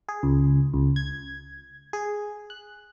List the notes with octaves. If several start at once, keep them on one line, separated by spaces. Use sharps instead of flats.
G#4
C#2
C#2
G#6
G#4
F#6